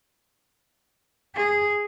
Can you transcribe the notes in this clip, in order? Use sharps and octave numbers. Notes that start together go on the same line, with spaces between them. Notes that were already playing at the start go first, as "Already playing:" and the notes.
G#4